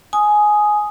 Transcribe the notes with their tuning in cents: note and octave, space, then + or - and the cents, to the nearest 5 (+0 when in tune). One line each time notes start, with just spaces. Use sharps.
G#5 +15 D#6 +0